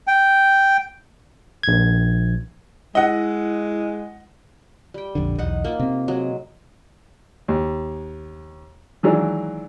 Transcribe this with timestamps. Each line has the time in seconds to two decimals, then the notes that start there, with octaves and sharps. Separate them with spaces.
0.07 G5
1.63 A#1 G#6
2.95 G#3 E4 D#5 F#5
4.94 G3 G5
5.15 A#1 F2 D3
5.39 B1 E2 D#4 F#5
5.64 A#3 F4
5.80 C3 C4
6.08 F#3 G#3
7.48 D#2
9.03 D#3 E3 F#3 G#3 D4